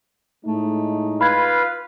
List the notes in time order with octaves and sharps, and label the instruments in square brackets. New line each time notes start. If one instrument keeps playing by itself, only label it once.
[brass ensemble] A2 G#3 D#4 [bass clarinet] A3
[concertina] F4 B4 F5 [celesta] B5 G#6